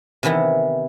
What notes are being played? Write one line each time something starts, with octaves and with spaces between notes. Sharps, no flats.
C3 D#3 E3 B3 E4